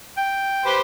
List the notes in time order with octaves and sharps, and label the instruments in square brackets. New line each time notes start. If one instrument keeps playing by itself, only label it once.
[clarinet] G5
[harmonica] G4 B4 C5